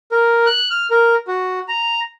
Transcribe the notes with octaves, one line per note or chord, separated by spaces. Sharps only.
A#4
F#6
F6
A#4
F#4
A#5